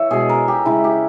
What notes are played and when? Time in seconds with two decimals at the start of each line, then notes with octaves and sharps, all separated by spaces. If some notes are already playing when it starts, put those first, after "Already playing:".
Already playing: E3 C#5 E5
0.11 B2 G#3 G#4
0.29 A#4
0.48 G4
0.65 C#3 E3 G#3 E4
0.84 G4